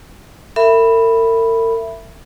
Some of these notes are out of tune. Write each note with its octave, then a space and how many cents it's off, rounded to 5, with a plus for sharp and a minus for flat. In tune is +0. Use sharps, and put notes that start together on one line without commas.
A#4 -45 E5 +15 B5 +0